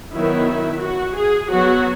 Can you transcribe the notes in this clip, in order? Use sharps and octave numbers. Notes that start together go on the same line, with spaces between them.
D#3 F#3 B3 E4
F#4
G#4
F#3 B3 F#4